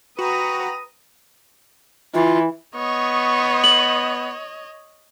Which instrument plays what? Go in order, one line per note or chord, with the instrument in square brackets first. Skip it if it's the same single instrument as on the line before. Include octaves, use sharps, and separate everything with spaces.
[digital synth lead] F#4 [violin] B4 [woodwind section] G5 A#5 [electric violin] D#6 A#6
[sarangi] E3 [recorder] F4
[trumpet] B3 [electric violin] C#5 D#5 [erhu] C#6
[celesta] F#7